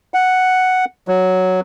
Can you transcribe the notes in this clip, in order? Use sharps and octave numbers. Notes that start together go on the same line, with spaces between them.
F#5
F#3